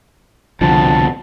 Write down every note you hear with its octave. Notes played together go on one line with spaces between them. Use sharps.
C2 F2 B2 D3 F3 A5